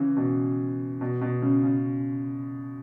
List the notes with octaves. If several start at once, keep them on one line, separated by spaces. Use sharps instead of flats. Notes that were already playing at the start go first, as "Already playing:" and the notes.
Already playing: C#3 E3
B2
B2
B2
C#3
C#3